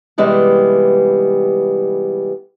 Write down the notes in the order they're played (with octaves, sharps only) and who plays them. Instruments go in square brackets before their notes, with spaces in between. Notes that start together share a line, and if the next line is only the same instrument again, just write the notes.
[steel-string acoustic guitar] C3 E3 G3 G#3 B3